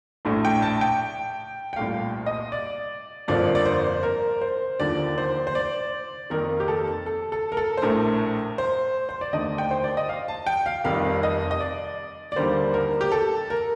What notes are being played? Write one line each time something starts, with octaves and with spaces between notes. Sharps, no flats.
A#1 A2 A3
G5
A5
G5
G5
C2 A#2 A3 F5
D#5
D5
G1 F2 D3 F3 A#3 D5
D5
C5
A#4
C5
D#2 D3 F3 A#3 D5
C5
C5
D5
F2 D#3 A#3 A#4
G4
A4
A4
A4
A#4
A4
C5
A#1 A2 A3 A#4
C5
C5
D5
D#2 D3 A3 D#5
G5
C5
D5
D#5
F5
A5
G5
F5
F1 F2 D#3 G3 F5
D#5
D#5
D5
D5
D#2 D3 G3 A#3 C5
A#4
G4
A4
A#4